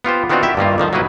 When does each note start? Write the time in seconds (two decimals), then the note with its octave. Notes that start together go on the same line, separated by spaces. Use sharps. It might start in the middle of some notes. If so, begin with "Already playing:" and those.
0.05 B3 F4 G4 C5
0.30 D#3 B3 C4 D4 F4 F#4
0.43 E4 G4 E5
0.57 G2 D#3 A#3 F4
0.78 D3 D#3 F3 C5
0.93 F#3 A#3 D#4 E4 B4